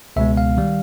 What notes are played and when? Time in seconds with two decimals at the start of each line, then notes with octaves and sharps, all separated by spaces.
0.16 C#2 B2 G#3 B3 E5
0.37 F5
0.57 D#3 G3